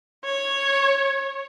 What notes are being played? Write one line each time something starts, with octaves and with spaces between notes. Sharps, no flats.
C#5